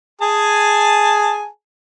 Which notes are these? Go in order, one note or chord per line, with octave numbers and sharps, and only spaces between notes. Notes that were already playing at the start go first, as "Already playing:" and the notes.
G#4 G#5 A5